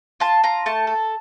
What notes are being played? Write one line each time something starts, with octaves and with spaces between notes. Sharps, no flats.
F4 A5
F4 A#5
A3 A5
A4